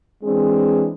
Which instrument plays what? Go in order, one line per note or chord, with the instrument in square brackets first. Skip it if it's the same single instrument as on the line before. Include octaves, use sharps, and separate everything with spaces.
[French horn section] E3 G#3 C4 D4 G#4